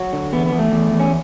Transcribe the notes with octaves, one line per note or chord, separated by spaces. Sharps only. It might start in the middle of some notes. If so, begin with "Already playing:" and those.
Already playing: F#3 F#4
D3
E2 B3
B3
E2
A3
E2
E2
C#4